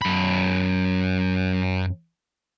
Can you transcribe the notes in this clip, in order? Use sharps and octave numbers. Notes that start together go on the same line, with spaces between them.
F#2 B5